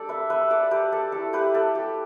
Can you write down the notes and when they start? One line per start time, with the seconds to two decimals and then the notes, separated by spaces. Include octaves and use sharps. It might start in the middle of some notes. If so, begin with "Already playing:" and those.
Already playing: G3 D4 A4 D5 G5
0.09 B4 E5
0.30 B4 E5
0.51 A4 D5
0.71 G4 B4
0.92 A4
1.12 A3 E4 A4
1.33 G4 B4
1.54 A4
1.75 G4